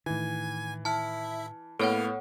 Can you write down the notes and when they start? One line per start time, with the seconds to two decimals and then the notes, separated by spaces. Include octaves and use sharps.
0.06 A2 D#3 E3 G#5 G#6
0.85 E4 E5 A5 F6
1.79 A2 A#3 B3 A4 C#5 F#5 F6